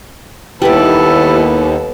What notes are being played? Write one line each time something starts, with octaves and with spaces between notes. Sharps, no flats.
D#2 G3 B3 E4 A4 B4 D5